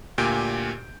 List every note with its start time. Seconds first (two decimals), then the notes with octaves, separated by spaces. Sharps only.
0.18 D2 A#2 G4 G#5 G6 D7